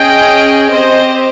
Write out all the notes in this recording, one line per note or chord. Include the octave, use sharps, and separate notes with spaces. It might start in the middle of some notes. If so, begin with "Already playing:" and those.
Already playing: C#4 G#4 D#5 G5
C4 G4 C5 D#5